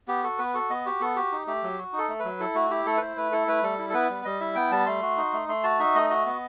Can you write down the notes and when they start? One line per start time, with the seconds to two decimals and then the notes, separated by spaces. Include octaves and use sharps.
0.08 B3 G4
0.24 F#4 A4
0.39 B3 B4
0.54 F#4 A4
0.70 B3 D#5
0.85 F#4 G4
1.01 B3 A4
1.16 F#4 G4
1.32 D#4
1.47 A3 G4
1.63 F#3
1.78 F#4
1.93 D#4
1.98 A4
2.09 A3
2.19 B4
2.25 F#3
2.40 E4 A4
2.55 A3 F#4
2.70 E4 G4
2.86 A3 A4
2.97 B4
3.01 E4 C5
3.17 A3 B4
3.32 E4 A4
3.48 A3 B4
3.63 G3 A4
3.79 E4
3.90 A4
3.94 B3 B4
4.10 G3
4.25 G3 D#5
4.40 E4 E5
4.55 B3 G5
4.71 G3 A5
4.86 A3 C6
5.02 F#4
5.17 D#4
5.33 A3
5.48 A3 C6
5.63 F#4 A5
5.79 D#4 E5
5.95 A3 D#5
6.10 F#4 D#5
6.26 B3